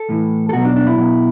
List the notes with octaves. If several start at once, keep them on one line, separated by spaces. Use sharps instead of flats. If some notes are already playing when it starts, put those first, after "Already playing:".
Already playing: A4
A2 E3
A4
B2 F#3 F#4
D4
D4
E4
B2 F#3